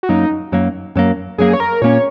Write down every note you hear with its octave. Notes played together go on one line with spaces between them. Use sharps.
F#4
F#2 F#3 A#3 D#4
F#2 F#3 A#3
F#2 F#3 A#3
F#2 F#3 A#3 G#4
C#5
A#4
A#2 A#3 C#4 C#5